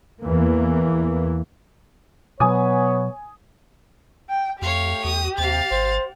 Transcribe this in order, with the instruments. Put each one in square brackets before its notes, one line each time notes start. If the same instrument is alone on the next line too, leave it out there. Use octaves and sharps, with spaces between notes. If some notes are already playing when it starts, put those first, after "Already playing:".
[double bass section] E2 E3 A#3
[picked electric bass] B2 F#3 [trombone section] B3 [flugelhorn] C#5 [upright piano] G#5 D#6
[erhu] G5
[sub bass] F2 [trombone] A3 [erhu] G4 [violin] C#5 F5
[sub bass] E2 [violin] D#6
[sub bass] D#2 [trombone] C3 [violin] F5 A6
[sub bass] G#1 [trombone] C5